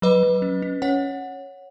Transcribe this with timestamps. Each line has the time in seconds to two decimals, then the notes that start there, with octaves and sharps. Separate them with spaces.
0.02 F#3 B4 D#5
0.23 F#3
0.42 C#4
0.62 C#4
0.82 C#4 C#5 F#5